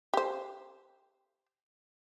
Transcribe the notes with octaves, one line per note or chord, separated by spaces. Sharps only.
G4 C5